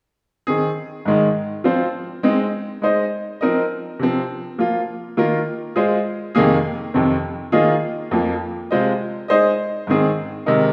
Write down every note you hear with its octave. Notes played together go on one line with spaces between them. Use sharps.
D#3 C4 G#4
G#2 D#3 G#3
F3 C4 F4 C5
G#3 C4 D#4
G#3 D#4 C5 D#5
F3 C4 D#4 A#4 D#5
C3 F3 C4
F3 A#3 F4
D#3 A#3 F4 A#4
G#3 F4 G#4 C5
F2 C3 D#3 A#3 G#4
F2 C3 D#3 C4
D#3 A#3 F4 G#4 D#5
F2 F3 A#3
C3 G#3 F4 C5 D#5
G#3 D#4 G#4 C5 D#5
G#2 D#3 C4 G#4
C3 D#3 G#3 D#4 A#4